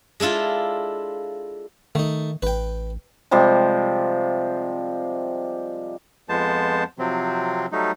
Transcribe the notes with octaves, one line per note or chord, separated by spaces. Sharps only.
G#3 D4 E4 F4 A4
D#3 A3 D#4
A1 B4 G5
C3 F3 G3 G#3
F2 F3 G#3 B3 C5 A5
C3 F3 F#3 C4
F#3 G3 A3 D#4